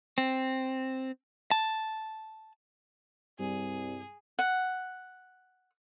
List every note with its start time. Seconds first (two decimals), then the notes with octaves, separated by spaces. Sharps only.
0.18 C4
1.51 A5
3.39 C2 G2 G3 G#4
4.39 F#5